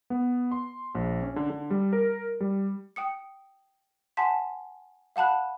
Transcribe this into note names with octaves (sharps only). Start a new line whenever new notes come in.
B3
C6
A#1
C#4
D3
D3
G3
A#4
G3
G5 D#6 C#7
F#5 G#5 A5 C6 B6
F5 F#5 A5 B5 F#6